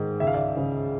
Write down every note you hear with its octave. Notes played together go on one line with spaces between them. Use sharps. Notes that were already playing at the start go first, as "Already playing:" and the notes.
Already playing: G#2 D#3
C#2 E5
F5
D5 E5
C#3